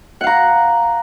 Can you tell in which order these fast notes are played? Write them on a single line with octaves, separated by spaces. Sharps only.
F#5 F5 A#5